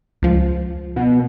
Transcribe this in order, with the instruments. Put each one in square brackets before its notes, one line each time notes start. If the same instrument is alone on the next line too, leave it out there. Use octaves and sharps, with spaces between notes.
[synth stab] C#2 F3
[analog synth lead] B2